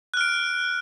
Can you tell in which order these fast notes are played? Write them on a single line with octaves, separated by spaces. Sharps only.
F#6 F6 D7